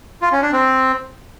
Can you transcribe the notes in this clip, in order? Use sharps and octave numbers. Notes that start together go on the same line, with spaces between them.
F4
C#4
D4
C4